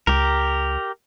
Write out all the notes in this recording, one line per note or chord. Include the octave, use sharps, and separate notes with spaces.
C#2 G4 A#4